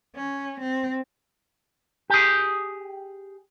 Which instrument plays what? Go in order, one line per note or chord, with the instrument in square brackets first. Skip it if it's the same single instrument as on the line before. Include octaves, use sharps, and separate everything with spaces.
[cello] C#4
C4
[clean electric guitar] G4 G#4